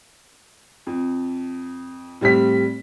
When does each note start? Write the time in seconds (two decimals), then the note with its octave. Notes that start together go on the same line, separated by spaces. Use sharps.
0.87 F2
2.21 A2 G3 C4 B6